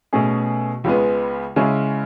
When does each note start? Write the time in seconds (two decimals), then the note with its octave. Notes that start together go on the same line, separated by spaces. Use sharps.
0.13 B2 A3 C#4 G#4
0.84 C#2 C#3 G#3 B3
1.56 C#3 G#3 C#4 E4